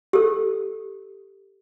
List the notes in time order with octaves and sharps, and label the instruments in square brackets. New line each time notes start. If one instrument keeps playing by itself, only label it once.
[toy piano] G4 A4